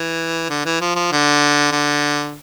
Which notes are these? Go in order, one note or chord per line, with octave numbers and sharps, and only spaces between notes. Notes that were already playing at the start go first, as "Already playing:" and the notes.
Already playing: E3
D3
E3
F3
F3
D3
D3